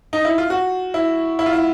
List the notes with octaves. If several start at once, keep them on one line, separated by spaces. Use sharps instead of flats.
D#4
E4
F4
F#4
E4
E4
F4
E4